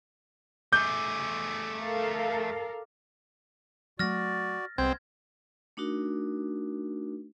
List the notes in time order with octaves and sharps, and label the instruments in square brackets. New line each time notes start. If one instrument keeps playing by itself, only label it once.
[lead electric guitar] A3 G#4 [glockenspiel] D6 [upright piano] G6
[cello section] A4 A#4 F5
[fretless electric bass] F#3 A3 [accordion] F#4 D5 [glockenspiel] F6 A6 A#6
[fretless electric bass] C2 [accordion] G#3 B3 C5 [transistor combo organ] C4 [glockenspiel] G#6
[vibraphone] A3 D4 D#4 F#4 A#4